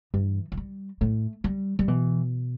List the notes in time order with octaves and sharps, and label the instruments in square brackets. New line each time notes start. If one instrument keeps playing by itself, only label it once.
[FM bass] G2 [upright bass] E3
[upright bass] E3
G3
[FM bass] A2 [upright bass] A3
[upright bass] G3
G3
[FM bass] B2 [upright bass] E3